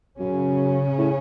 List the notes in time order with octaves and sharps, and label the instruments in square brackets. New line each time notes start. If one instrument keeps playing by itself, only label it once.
[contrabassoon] F#2 [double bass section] C#3 C#4
[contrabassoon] A2